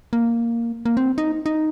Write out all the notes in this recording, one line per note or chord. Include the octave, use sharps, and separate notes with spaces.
A#3
A#3
C4
D#4
D#4